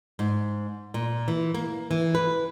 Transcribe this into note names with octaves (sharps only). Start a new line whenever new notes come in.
G#2
A#2
E3
A#3
E3
B4